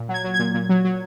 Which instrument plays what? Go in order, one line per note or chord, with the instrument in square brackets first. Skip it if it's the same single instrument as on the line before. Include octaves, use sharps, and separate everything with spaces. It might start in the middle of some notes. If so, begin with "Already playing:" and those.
Already playing: [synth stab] A#2
F#3
G#6
F#3
G#6
A#2
A#2
F#3
F#3